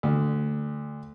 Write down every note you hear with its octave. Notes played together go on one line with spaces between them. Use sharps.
D2